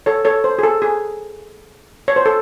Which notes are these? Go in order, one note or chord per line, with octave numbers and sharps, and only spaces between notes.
A4 C#5
A4 C#5
C5
G#4
A4
G#4
C#5
C5
A4